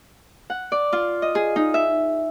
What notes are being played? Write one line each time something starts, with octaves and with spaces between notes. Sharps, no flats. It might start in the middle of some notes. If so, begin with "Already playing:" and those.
F#5
D5
F4
D#5
G#4
D#4
E5